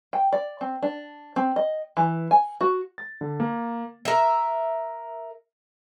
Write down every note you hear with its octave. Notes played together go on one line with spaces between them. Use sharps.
G5
D5
C4
D4
C4
D#5
E3
G#5
F#4
A6
D3
A#3
A#4 E5